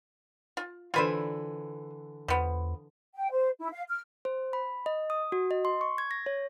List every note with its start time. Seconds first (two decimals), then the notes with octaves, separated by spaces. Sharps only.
0.57 F4
0.94 D3 E3 F4 B4 C5 G#5
2.28 E2 F3 B3
3.14 G5
3.30 C5
3.59 E4
3.71 F5
3.88 F6
4.25 C5
4.53 B5
4.86 D#5
5.10 D#6
5.32 F#4
5.51 D#5
5.65 C6
5.81 C#6
5.98 G#6
6.11 A#6
6.26 C#5